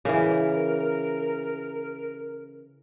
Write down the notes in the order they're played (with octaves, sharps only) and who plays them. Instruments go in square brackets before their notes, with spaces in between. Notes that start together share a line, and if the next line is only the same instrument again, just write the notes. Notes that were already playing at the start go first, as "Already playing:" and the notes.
[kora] C#3 E3 [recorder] A#4